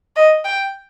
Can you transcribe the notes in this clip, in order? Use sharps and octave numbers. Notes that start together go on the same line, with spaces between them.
D#5
G5